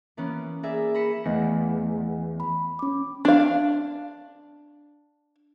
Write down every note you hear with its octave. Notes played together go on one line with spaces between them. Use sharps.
E3 A#3 B3 C#4
G#4 A#4 D5 E5
B5 A#6 B6 C#7 D#7 E7
E2 A3 B3 D#5
B5
C#4 D6
D4 F5